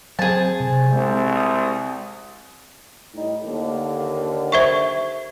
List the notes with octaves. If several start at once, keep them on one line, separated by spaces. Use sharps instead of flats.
F#3 C4 G#4 C5 A5
C3
C2 G#3 C4
D#6
A2 G3 D#4
D#2 D3
C5 E5 C#6